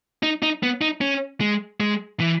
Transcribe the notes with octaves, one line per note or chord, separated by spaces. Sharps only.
D#4
D#4
B3
D#4
C#4
G#3
G#3
E3